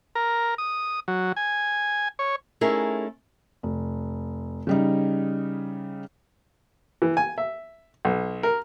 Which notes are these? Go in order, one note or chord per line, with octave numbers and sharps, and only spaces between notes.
A#4
D#6
F#3
G#5
C#5
A3 C#4 D#4 E4 G#4 A#4
F1
C#3 G3 D#4
E3
G#5
E5
B1
A#4